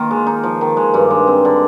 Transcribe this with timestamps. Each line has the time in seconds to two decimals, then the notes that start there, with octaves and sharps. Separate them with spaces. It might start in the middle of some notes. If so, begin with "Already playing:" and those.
Already playing: D#3 A#3 F4
0.11 G#3
0.27 D#4
0.43 F3
0.61 D#3
0.77 G#3
0.94 G2
1.10 G#3
1.27 C4
1.45 D3